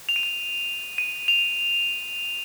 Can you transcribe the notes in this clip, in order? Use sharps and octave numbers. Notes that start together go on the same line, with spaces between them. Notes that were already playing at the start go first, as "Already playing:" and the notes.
F7
D#7
F7
D#7
F7